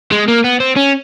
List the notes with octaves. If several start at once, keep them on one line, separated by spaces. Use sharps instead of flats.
G#3
A#3
B3
C4
C#4